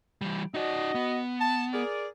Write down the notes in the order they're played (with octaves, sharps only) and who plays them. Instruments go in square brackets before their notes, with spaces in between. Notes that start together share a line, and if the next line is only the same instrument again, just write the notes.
[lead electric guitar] E3 G3
[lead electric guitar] D#4 D5 [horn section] F#4 D#5
[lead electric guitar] B3
[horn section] A5
G#4 A#4 D5